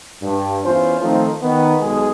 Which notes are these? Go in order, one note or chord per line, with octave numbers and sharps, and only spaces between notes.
G2
E2 C#4 E4 F4 C5
D#3 F3 A3 C4 D#4 F4
D#3 B3
B1 B2 G#3 G#4